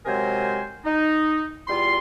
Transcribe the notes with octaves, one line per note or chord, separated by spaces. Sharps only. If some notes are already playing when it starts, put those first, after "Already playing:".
C3 F#3 G#3 A#4 C5 G#5
D#4
E2 G3 F4 C6